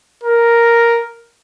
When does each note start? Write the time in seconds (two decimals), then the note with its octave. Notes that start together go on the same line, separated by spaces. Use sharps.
0.23 A#4